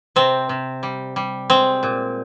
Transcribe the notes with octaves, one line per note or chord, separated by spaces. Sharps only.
C3 C4
C3
G3
G3
G#3 C4
A#2